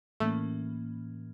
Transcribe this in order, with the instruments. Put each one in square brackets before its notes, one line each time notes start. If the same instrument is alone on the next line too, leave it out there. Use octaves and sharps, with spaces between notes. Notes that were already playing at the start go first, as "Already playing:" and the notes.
[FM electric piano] A2 E3 A#3 C#4 [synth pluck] A3